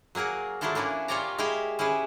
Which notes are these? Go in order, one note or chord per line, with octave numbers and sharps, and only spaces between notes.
F#3 A#3 G#4 A#4 F#5
F#3 A3 D4 E4 F4 A4
E3 A#3 C#4 D4 E4
A#2 F4 G4 C#5 D5 A#5
G#3 E4 G4 F5 G5 G#5
C#4 E4 G4 G#4 B4